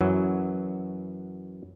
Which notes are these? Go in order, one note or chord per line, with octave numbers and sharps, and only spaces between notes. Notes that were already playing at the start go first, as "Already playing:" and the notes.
F#2 E3 F#3